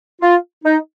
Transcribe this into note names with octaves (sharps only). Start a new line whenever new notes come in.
F4
D#4